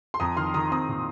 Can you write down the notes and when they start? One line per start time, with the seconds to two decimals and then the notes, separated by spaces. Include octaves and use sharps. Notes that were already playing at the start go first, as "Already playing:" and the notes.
0.14 C6
0.20 F2 A#5 D#6
0.37 D#3 C6 F6
0.54 D#3 A#5 D#6
0.71 C4 A#5 D#6
0.89 A#2